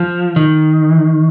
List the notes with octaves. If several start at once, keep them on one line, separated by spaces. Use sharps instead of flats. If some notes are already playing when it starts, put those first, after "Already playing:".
Already playing: F3
D#3